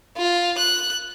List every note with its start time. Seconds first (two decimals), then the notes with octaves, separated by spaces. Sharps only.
0.17 F4
0.58 F#6